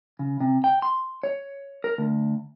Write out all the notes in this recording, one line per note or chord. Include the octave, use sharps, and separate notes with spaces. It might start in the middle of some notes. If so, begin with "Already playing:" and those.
C#3
C3
G5
C6
C#5
A#4
D2